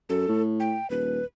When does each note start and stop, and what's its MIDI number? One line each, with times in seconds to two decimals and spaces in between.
0.09 0.28 42
0.09 0.42 69
0.29 0.77 45
0.60 0.89 79
0.90 1.21 27
0.90 1.25 71